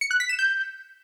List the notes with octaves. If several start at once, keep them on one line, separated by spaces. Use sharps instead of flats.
C#7
F#6
B6
E7
G6